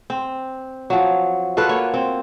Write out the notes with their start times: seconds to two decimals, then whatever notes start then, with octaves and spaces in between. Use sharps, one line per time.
0.10 C4
0.90 F3 F#3
1.57 F4 F#4 A4 B4
1.69 A#3 C#5
1.94 C4